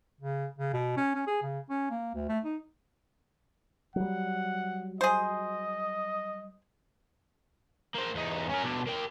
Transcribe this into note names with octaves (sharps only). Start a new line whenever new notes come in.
C#3
C#3
B2
C#4
C#4
G#4
C#3
C#4
A#3
D2
A3
D#4
F#3 G3 F#5
G#4 C5 D#5
A#3 C5
E2 D#4
C#4 A#4
B2 D4
A#3 G5